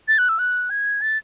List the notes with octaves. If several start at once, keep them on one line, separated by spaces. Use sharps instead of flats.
A6
F#6
E6
F#6
G#6
A6